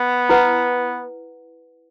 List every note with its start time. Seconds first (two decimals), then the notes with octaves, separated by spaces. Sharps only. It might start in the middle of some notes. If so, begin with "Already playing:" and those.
Already playing: B3
0.29 E4 B4 F#5